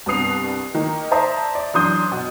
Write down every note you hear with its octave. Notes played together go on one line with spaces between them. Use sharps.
C2 G2 B3 D#6 C7 F7
D#3 A#3
C5 D5 E5 A5 A#5 D#6
D5
F#2 E3 D4 C6 D#6 G6
B2